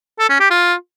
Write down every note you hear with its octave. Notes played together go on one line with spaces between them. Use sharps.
A4
C#4
G4
F4